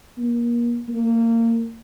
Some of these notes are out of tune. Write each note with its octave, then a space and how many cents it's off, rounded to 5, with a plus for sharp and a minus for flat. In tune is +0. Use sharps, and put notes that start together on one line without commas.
A#3 +30
A#3 -25